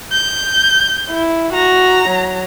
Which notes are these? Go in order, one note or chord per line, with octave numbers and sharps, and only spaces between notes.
G6
E4
F#4 A#5
F#3